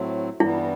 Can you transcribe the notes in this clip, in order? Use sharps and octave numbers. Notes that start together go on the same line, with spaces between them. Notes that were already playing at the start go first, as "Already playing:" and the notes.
Already playing: A2 F#3 A3 C4
G2 E3 G3 B3 E4